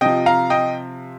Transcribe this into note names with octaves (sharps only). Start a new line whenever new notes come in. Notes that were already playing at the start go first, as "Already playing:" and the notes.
C3 F3 D#5 G5
F5 A#5
D#5 G5